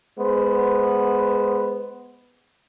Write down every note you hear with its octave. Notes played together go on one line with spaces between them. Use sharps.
G#3 B3 C5